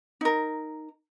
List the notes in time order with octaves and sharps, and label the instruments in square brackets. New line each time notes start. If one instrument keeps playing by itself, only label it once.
[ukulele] D#4 A#4